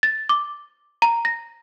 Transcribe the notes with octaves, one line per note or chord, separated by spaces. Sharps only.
A6
D6
A#5
A#6